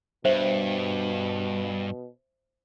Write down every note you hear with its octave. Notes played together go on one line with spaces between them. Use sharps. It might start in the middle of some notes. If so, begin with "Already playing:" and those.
G2 B2 C5 E5